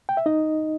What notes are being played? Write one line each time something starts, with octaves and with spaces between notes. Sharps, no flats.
G5
E5
D#4 D#5